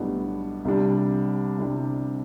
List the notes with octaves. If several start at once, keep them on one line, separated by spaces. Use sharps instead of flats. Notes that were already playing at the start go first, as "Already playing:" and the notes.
Already playing: B1 A2 G3 B3 D4
C2 C3 G3 D4
C2 C3 G3 D4